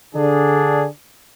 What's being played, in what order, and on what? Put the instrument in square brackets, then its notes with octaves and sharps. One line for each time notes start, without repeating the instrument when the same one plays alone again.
[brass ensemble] D3 D4 G#4